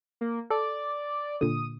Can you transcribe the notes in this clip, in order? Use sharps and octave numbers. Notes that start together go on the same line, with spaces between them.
A#3
A4 D5
A#2 D3 D#6